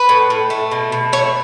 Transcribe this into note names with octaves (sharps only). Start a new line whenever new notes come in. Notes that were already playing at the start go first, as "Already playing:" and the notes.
Already playing: B4
A2
A2
A3
B2
B2
A3 C#5